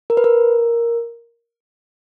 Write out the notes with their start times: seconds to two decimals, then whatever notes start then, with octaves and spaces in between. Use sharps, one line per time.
0.10 A#4
0.17 B4
0.24 A#4